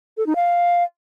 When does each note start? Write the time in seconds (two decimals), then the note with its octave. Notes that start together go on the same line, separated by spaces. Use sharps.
0.17 A4
0.26 D#4
0.36 F5